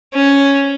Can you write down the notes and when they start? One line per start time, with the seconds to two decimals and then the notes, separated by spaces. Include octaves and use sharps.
0.14 C#4